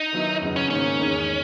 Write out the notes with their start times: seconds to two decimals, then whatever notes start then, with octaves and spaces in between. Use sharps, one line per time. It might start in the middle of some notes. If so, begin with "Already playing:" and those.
Already playing: D#4
0.13 D#3 F#3 B3 E4
0.41 F#2 C#3 F#3 B3 D#4
0.56 C#4
0.70 G#2 D#3 A#3 C#4
0.99 E2 D#3 G#3 D#4